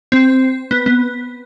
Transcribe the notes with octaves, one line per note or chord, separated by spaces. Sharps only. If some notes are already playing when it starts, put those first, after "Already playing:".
C4
B3
B3